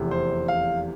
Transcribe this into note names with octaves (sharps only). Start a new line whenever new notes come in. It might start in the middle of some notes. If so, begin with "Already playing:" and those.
Already playing: F1 E2 C3
C5
F5